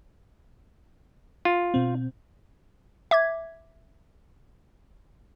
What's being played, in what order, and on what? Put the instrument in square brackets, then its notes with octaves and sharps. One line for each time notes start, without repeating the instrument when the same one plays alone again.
[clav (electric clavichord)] F4
[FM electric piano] B2 C4
[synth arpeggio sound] E5 D6 G#6